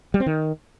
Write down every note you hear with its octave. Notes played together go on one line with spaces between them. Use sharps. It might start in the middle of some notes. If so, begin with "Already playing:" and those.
G3
C4
D#3